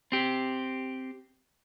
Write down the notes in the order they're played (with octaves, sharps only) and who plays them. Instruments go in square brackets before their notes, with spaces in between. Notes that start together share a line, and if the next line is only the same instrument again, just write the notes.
[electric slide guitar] C4 G4